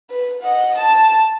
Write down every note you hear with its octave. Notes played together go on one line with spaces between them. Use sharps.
B4
D#5 F#5
A5